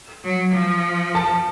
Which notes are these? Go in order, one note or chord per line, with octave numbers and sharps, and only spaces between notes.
F#3
F3
A5